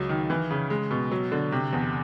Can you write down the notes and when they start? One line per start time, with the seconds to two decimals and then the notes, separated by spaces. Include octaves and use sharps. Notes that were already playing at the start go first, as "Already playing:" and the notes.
Already playing: C#2 F#3
0.09 D#3
0.30 E3
0.50 C#3
0.70 G#3
0.91 B2
1.12 F#3
1.32 D3
1.52 C3
1.73 E2